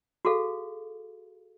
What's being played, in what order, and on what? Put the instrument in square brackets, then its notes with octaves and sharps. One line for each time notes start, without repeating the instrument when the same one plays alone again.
[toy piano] F#4 G#4 A4 F5